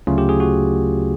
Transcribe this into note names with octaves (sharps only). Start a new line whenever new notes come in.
D2 C#3 F#3 A3 C#4 F4
G4
G#4
F#4